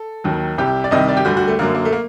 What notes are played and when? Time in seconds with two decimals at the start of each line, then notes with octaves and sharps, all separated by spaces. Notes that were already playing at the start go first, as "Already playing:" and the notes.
Already playing: A4
0.24 D#2 D#3 F#3
0.58 C2 C3 G3 G4
0.84 D5
0.91 C2 C3 D#3 G3 D#5
1.08 D5
1.17 G4
1.25 D2 D3 G3 F#4
1.37 F#4
1.48 A3
1.59 F#2 D3 F#3 A#3
1.75 A#3
1.85 A3
1.92 A#3